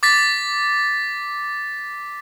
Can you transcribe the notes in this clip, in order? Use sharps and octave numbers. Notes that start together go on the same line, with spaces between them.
D6 A6 B6